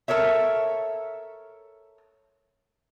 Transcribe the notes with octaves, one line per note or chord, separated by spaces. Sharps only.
A4 A#4 C#5 E5